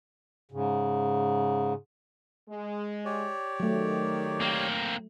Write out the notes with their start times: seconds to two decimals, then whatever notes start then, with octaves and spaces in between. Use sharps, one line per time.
0.52 G#2 C#3
2.49 G#3
3.05 G4 C#5 D5
3.60 D#3 F#3 A3
4.40 A#3 C4